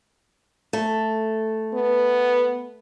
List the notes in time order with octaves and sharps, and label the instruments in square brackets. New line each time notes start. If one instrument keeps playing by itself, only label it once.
[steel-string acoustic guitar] A3
[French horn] B3